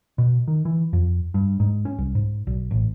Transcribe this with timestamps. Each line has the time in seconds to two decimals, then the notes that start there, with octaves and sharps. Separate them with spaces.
0.18 B2
0.48 D#3
0.65 E3
0.93 F2
1.34 G2
1.60 G#2
1.85 C#4
1.98 C2
2.15 G#2
2.47 B1
2.71 A1